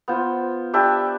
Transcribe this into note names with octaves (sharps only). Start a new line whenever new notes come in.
B3 F4 C5
D4 G4 B4 E5